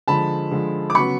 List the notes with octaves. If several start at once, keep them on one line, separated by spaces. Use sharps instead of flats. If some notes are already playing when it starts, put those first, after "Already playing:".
D3 F3 G#3 A5 B5
D3 F3 G#3
D6
C#3 F#3 B3 B5 C#6